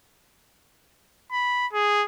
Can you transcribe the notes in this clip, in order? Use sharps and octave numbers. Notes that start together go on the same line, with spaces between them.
B5
G#4